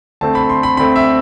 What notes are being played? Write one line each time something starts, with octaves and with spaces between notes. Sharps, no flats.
D2 D3 A3 C4 A5
B5
C6
B5
D2 D3 A3 C4 B5
E5